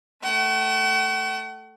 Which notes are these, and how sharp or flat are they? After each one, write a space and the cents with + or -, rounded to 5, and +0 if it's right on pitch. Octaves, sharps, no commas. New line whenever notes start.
A3 +0 F#5 +45